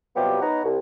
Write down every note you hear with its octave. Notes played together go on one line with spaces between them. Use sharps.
C3 F#3 G3 B3 F4 G4
B3 D#4 C#5 F#5 A#5
C2